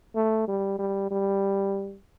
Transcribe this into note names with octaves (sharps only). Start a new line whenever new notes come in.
A3
G3
G3
G3